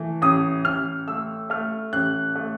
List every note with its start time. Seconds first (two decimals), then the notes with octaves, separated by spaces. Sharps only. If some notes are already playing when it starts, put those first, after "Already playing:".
Already playing: E3 A3
0.22 A1 D#6
0.65 A1 F6
1.07 A3 E6
1.50 A3 F6
1.93 A1 F#6
2.35 A3